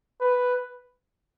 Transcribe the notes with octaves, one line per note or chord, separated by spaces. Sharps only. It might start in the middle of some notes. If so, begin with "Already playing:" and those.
B4